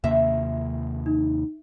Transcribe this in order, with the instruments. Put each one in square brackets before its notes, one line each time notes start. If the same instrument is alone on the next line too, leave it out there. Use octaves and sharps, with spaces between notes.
[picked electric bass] D#2 C3 A#3 [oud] E5
[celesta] D#4